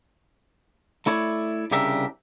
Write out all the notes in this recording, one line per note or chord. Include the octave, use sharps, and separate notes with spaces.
A3 E4 C#5 D5
C2 C#3 D4 G4 A#4 E5